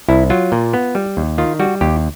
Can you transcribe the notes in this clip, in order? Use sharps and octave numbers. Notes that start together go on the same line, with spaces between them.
C2 E4
F#3 F4
A#2
B3
G3
D#2
D#3 F4
G3 F#4
D#2 G4